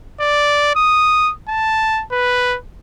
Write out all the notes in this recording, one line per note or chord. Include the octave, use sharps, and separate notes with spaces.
D5
D#6
A5
B4